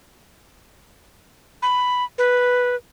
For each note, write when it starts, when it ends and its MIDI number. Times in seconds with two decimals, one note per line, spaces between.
1.62 2.04 83
2.18 2.76 71